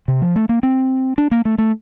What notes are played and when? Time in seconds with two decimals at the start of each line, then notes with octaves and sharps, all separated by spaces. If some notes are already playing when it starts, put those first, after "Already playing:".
0.08 C3
0.22 F3
0.36 A3
0.49 A#3
0.63 C4
1.18 D4
1.31 A#3
1.45 A3
1.58 A3